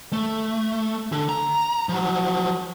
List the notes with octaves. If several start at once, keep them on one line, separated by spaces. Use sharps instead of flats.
A3
D3
A#5
F3 F#3